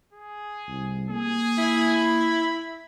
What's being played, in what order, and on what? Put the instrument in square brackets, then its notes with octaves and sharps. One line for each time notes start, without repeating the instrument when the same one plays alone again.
[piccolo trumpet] G#4
[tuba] C2
[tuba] A#3 [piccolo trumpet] G#4
[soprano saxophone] E4
[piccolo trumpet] B5